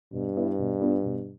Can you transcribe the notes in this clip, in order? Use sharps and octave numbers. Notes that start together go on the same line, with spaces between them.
G2 B2
B3 E4 B4 D5
B2
B3 D4 F4
B2